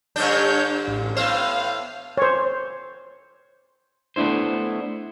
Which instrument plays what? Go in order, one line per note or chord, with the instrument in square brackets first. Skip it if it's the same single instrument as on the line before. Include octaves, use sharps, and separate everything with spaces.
[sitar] G2 D3 D4 [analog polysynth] C#5 G6
[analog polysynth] A1
[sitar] A2 B3 C5 [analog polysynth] F5
[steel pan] C5 C#5
[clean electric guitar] A3 B3 D4 E4 C5